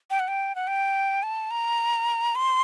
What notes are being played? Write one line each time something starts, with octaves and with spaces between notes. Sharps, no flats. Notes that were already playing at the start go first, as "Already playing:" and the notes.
G5
F#5
G5
F#5
G5
A5
A#5
C6